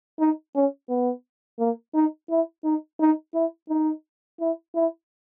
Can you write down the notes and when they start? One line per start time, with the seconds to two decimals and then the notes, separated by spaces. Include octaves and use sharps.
0.19 D#4
0.55 C#4
0.89 B3
1.59 A#3
1.94 D#4
2.30 E4
2.64 D#4
3.00 D#4
3.34 E4
3.69 D#4
4.40 E4
4.75 E4